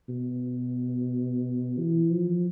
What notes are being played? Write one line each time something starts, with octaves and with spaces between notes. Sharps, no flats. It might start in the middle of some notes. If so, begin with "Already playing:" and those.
B2
E3
F3